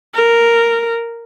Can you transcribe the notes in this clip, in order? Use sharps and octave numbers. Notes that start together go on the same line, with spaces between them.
A#4